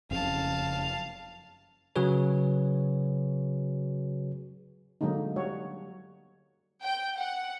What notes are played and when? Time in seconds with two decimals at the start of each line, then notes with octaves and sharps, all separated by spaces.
0.11 F#1 F2 C#3 F5 A5
1.96 C#3 F#3 F#4 G#4 B4 C#5
5.01 D3 F#3 G#3 A#3 D#4
5.36 G3 F#4 C#5
6.83 G5
7.16 F#5